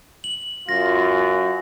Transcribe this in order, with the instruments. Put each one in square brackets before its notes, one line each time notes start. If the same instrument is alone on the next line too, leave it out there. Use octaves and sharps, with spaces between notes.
[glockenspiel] F#7
[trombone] F#2 [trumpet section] F4 [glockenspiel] A#6